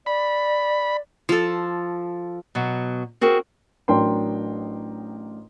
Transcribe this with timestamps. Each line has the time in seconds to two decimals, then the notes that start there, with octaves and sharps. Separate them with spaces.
0.06 D5 B5
1.29 F3 A4
2.55 B2 F#3
3.21 C4 F#4 G#4 A#4
3.88 A1 F#3 D4 A#4 G5 C6